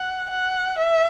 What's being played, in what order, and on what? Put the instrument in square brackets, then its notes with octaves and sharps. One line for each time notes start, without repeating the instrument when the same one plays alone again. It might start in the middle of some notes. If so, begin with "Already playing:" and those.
Already playing: [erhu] F#5
F#5
E5